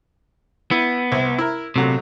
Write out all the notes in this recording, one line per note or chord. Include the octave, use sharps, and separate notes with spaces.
B3 E4
C2
E4 A#4
A#1 C3 F#3 A3